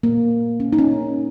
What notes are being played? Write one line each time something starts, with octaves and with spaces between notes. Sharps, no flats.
A#2 A#3
C#4
D#4
C#4